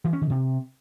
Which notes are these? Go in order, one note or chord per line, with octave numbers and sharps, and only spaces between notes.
E3
C#4
D#3
C3